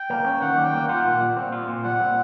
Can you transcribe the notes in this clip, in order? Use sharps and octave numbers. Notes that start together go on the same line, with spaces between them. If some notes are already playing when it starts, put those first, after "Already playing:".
Already playing: G5
A#3
C#4
D#3 F#5
G3
G5
A#3
F4 F#5
A#2
G3
C4
F4
A#2
G3 F#5
C4